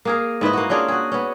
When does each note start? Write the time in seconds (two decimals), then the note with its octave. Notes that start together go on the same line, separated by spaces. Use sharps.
0.05 A#3 G#4 A#4
0.41 G#2 E4 B4 D#5
0.53 A#3 F#4
0.70 C#4 D4 F4 G#4
0.88 F#4 G#4
1.12 B3 C#4